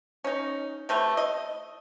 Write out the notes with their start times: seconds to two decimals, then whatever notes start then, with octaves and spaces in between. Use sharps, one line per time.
0.24 C#4 D#4
0.89 C3 A3 B4
1.17 D#5